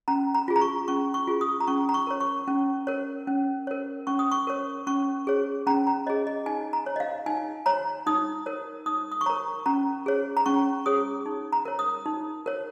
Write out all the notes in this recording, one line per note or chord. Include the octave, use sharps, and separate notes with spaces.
C#4 A#5
A#5
F4 G#4
A#5
C#6
C#4 C#6
C#6
F4 G#4
D#6
A#5
C#4 C#6
A#5
C#6
A#4 C#5
C#6
C#4
A#4 C#5
C#4
A#4 C#5
C#4 C#6
D#6
C#6
A#4 C#5
C#4 C#6
G#4 C#5
C#4 A#5
A#5
G#4 C#5 D#5
D#5
D#4 G#5
A#5
C#5
D#5
F5
D#4 G#5
C#5 A#5
D#4 D#6
A#4 C#5
D#4 D#6
D#6
C#6
A#4 C#5 A#5
C#4 A#5
G#4 C#5
A#5
C#4 C#6
G#4 C#5 D#6
D#4
A#5
A#4 C#5
D#6
D#4
A#4 C#5